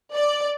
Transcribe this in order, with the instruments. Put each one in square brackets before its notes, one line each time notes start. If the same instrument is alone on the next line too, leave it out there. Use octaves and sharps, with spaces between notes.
[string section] D5